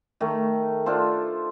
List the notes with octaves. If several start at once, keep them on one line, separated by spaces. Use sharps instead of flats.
D#3 A3
D4 F4 A4 C5